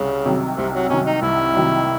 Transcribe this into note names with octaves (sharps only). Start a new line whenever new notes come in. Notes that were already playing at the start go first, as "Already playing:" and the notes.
Already playing: C2 C#3
C3 D#3 F#3
C2 C3
F#3
C3 D#3 F#3 C#4
D#4
C2 E4
C3 D#3 F#3